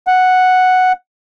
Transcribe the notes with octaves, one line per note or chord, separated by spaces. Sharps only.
F#5